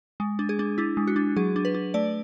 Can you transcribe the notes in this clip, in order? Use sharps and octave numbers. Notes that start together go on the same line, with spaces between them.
G#3
D4
G#4
D4
D4 E4
G#3
F#4
D4
F#3 G#4
D4
B4
D4
A3 D5